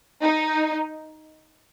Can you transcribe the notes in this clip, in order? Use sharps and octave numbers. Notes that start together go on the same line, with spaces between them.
D#4